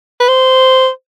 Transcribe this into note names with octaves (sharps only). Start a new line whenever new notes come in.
B4
C5